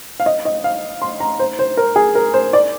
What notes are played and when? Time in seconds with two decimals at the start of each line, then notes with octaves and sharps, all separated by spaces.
0.20 F5
0.26 D#5
0.45 D#5
0.64 F5
1.02 C6
1.20 A#5
1.39 C5
1.59 C5
1.77 A#4
1.96 G#4
2.15 A#4
2.34 C5
2.53 D5